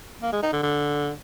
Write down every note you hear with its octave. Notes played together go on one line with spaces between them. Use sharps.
A#3
G#3
D#4
D3
D3